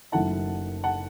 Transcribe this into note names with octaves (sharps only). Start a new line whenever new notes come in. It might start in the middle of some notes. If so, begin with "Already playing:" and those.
F#1 F#2 D#3 A3 E4 F#5 A5
F#5 A5